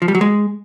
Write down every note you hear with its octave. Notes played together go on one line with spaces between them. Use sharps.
F3
G3
F#3
G#3